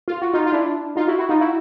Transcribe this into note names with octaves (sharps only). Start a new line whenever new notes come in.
F4
F#4
D#4 F4
F4
D4 E4
D#4 F4
E4 F#4
E4 F#4
D#4 F4
E4 F#4